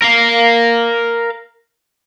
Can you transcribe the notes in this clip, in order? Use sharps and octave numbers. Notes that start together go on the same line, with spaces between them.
A#4 F5